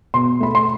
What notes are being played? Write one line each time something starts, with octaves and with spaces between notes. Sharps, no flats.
B2 C6
A3 B5
C6